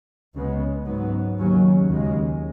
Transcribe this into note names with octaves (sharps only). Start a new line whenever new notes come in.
C#2 C#3 G#3 B3
G#2 F#3 B3
D#2 C#3 F#3 C#4
D#2 C#3 G#3